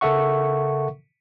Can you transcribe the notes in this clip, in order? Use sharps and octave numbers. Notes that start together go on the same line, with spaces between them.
C#3 A4 A#4 E5 F#5 C#6